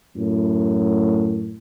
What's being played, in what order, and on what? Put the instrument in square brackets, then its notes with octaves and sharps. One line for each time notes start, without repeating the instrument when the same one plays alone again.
[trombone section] F#2 A2